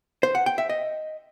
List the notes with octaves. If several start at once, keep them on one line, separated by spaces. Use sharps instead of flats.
C5
F#5
G5
E5
D#5